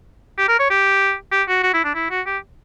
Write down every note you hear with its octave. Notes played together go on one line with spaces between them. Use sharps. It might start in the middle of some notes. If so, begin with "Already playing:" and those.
G4
A#4
C#5
G4
G4
F#4
F#4
E4
D4
E4
F#4
G4